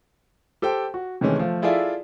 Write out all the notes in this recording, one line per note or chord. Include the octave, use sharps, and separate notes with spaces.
G4 A4 C5 G5
F#4
C3 D#3 E3 G#3 A3 C#4
F3 A3
E4 F4 G#4 A4 D5 E5